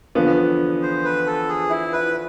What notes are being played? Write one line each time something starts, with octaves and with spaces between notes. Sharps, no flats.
E2 D3 F3 B3
C5
B4
A4
G#4
E4
B4